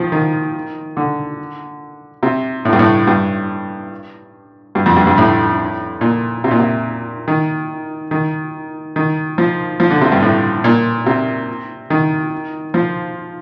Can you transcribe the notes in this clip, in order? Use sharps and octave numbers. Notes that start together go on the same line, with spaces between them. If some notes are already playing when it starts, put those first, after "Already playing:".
Already playing: D#3 F3
D#3
D3
C3
A2
G2
A2
G2
G2
F2
G2
G2
A2
A#2
C3
A#2
C3
D#3
D#3
D#3
F3
F3
D3
C3
G2
A2
A#2
C3
D#3
F3